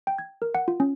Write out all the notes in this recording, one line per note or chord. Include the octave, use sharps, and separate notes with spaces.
G5
G#6
A#4
F#5
F4
C#4